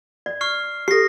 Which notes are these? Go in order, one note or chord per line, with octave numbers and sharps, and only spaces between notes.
D5
C#6 F6 C7
G4 A4 A#6 C7